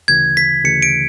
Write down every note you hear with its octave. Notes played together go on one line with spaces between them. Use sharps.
D2 C#3 E3 G#6
B6
D2 C#3 E3 C#7
D7